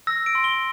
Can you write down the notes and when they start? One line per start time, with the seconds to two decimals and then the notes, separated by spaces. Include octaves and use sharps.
0.07 E6 A#6
0.26 D7
0.35 C6
0.44 G7